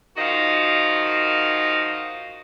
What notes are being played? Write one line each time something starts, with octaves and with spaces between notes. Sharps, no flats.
D#3 F3 F#4 D#5 F5